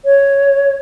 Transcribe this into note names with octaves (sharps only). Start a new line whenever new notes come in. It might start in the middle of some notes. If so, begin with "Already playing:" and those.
C#5